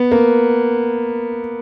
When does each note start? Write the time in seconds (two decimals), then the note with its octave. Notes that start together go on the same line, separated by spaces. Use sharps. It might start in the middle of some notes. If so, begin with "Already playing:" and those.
Already playing: B3
0.12 A#3